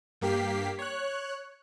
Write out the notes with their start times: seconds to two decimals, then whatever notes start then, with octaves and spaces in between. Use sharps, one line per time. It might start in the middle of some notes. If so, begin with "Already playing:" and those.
0.21 G2 A#3 G4 B6 C7
0.79 C#5 F#6